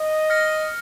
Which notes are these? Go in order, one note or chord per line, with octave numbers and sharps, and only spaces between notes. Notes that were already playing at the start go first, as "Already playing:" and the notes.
Already playing: D#5
F6 A#6 C#7